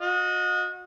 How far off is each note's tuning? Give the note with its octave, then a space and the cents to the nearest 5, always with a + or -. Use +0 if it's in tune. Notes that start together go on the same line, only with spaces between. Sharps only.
F#4 -35 D#5 +0